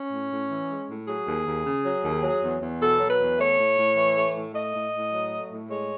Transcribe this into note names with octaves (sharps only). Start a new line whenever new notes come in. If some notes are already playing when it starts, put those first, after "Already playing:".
Already playing: C#4
A2
A2
E3
G#3
A2
F#3 G#4
D#2
D#2
C#3
F#3
D#2
F#3
E2
E2
B2 A4
F#3
B4
E2
A3 C#5
A2
A2
E3
A3
A2
A3 D#5
A2
A2
F#3
A3
A2
G#3 C#5